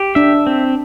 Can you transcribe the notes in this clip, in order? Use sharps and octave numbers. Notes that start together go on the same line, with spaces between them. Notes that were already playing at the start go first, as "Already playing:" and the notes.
Already playing: G4
D4 E5
C4